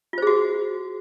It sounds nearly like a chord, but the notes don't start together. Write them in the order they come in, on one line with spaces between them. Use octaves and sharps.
F4 C5 G#4 F#4